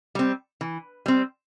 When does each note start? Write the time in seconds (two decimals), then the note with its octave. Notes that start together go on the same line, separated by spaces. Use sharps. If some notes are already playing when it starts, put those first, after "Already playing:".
0.15 G3 C4
0.61 E3
1.06 G3 C4